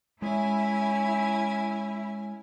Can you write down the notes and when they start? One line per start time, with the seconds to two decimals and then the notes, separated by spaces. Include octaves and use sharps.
0.22 G#3 C#4 E4 G#5